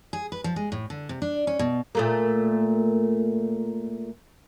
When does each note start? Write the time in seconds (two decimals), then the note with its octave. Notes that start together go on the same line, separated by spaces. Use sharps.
0.13 G#4
0.32 B4
0.44 F3
0.56 G#3
0.72 A2
0.90 D3
1.09 C3
1.22 D4
1.47 C#4
1.59 B2
1.95 A#2 A3 A#3